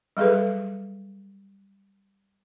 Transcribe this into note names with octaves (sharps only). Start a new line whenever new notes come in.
F#3 G3 G#4 A4 B4